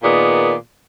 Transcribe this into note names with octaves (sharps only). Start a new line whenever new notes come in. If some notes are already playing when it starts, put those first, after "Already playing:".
A#2 D#3 B3 G#4 D5